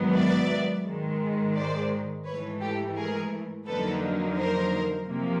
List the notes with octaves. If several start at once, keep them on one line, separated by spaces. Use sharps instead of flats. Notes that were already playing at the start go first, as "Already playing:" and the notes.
Already playing: G#2 D#3 F#3 B3
D5 E5
G#2 D#3 G#3
C5 D5
G#2 E3 A3 B4 C#5
G4 A4
G#4 A#4
F2 D3 F#3 A#3 D#4 A4 B4
A#4 C5
C3 F3 A#3